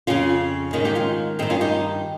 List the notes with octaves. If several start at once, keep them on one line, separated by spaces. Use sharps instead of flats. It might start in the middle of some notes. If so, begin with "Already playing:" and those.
F2 C#3 C#4 F4
G#2 D#3 C#4 F4
D#4 G4
C#4 F4
G2 D#3 C4 D#4
C#4 F4
D#4 G4